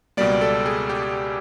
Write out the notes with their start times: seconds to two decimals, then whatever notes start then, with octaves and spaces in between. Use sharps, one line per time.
0.17 C#2 B2 G3 A#3 D5
0.41 A4
0.66 G#4
0.90 G4